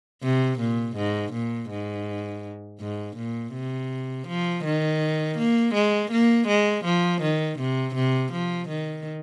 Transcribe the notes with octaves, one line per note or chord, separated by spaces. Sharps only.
C3
A#2
G#2
A#2
G#2
G#2
A#2
C3
F3
D#3
A#3
G#3
A#3
G#3
F3
D#3
C3
C3
F3
D#3